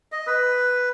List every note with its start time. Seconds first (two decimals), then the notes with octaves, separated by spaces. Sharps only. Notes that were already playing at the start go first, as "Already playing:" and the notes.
0.12 D#5
0.27 B4